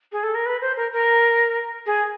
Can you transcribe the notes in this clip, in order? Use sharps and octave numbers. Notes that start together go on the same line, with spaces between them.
G#4
A4
A#4
B4
C5
A#4
A#4
G#4